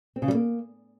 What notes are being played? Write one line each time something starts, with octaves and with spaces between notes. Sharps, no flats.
C4
C#3
G3
A#3